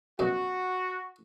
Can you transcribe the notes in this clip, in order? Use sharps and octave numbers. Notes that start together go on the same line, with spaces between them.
F#2 B2 F#4